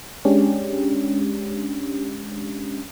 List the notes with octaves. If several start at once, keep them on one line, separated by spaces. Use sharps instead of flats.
G#3 C#4 D4 G4